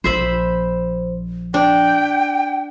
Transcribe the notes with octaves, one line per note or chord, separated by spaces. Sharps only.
A#1 C5 E5 B5
D4 G5